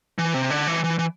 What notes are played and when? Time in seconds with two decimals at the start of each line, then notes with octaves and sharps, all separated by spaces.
0.18 E3
0.34 C3
0.51 D3
0.67 E3
0.84 E3
0.99 E3